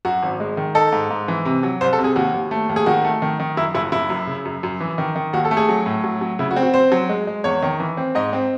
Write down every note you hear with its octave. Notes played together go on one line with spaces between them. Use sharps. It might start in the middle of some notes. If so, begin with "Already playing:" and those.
F#2 F#4
G#1
G#3
D#3
D#4 A4
G#2
G#2
E3
C3
F#3
C2 C5
A4
C3
G#4
D#2 F#4
D#2
A3
D#2
G#4
D#3 F#4
A3
D#3
D#3
F#2 E4
F#1 E4
F#1 E4
F#2
C#3
F#2
F#2
E3
D#3
D#3
D#2 F#4
A4
A3
G#4
F#3
A2
F#3
F#3
C#3 E4
F#4
C4
F#4
C4 C5
F#3
G#3
G#3
E2 C#5
D#3
E3
C4
G#2 D#5
C4